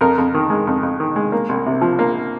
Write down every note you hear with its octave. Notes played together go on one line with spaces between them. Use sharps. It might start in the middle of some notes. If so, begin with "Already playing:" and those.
F2 A#4
F2
D#3
G#3
F2
F2
D#3
G#3
A#3
C2
C3
F3
A#3